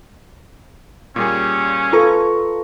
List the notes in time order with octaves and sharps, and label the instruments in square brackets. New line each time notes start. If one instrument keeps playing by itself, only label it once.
[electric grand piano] A#2 G3 G#4 [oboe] C#4
[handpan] F4 A4 B4 [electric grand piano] A#5 C#6